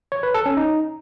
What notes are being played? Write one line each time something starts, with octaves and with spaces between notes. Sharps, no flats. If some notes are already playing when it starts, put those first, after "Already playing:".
C#5
B4
A4
C#4
D#4